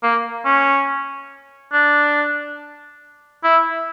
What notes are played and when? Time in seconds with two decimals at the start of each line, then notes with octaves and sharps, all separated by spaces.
0.03 A#3
0.45 C#4
1.73 D4
3.44 E4